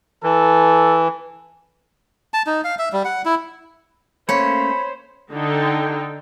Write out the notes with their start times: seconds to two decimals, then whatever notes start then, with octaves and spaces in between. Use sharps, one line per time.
0.23 E3 A4
2.34 A5
2.47 D#4
2.64 F5
2.79 E5
2.93 G3
3.05 F#5
3.25 E4
4.29 A3 A#3 C#4 C5 C#5 B5
5.32 D3 D#4 A4 G5